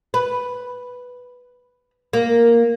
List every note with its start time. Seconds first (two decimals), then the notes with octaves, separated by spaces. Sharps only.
0.14 B4
2.13 A#3